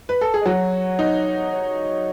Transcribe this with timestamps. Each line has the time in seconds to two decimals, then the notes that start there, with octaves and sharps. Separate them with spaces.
0.09 B4
0.21 A4
0.34 G#4
0.41 D#5
0.46 F#3 F#4 C#5
0.99 D#4
1.52 C#5